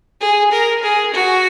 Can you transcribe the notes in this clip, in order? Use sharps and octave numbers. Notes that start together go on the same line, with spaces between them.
G#4
A#4
G#4
F#4